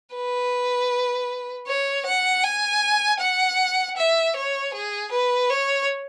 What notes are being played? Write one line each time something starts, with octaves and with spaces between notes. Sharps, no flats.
B4
C#5
F#5
G#5
F#5
E5
C#5
G#4
B4
C#5